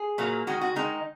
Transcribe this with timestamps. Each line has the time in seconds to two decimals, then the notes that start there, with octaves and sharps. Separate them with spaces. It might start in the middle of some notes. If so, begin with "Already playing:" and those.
Already playing: G#4
0.18 A#2 F#3 A#3
0.47 D#3 G#3 F#4
0.61 F#4
0.76 D#3 G#3 D#4